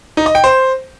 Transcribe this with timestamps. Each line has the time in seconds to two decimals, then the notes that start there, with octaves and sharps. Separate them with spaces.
0.17 D#4
0.26 D#5
0.35 G5
0.44 C5